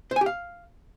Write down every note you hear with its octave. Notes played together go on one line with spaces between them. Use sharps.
C5
G#5
G4
F5